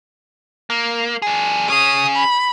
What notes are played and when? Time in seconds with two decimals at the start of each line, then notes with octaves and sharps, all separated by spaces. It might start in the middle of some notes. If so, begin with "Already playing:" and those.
0.70 A#3
1.22 D4 G#4
1.70 C#4 G#4 D#6
2.16 B5